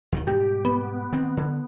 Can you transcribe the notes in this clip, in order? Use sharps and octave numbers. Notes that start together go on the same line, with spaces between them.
D#2 B2 D#3
G#2 B2 G3 G4
B3
D#3 C4
D3